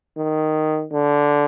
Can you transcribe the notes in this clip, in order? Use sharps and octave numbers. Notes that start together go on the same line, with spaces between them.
D#3
D3